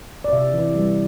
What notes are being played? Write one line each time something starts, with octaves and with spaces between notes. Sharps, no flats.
D5
C3 E5
E3
G3